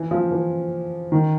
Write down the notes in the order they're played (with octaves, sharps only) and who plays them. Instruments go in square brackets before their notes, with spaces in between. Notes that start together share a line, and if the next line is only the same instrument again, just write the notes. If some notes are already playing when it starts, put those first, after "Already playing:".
Already playing: [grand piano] E3
F3
E3
D#3